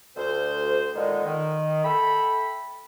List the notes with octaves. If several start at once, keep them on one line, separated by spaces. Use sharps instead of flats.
D2 C5
A#2 D3 D#3 G#3
D#3
A4 E5 G5 B5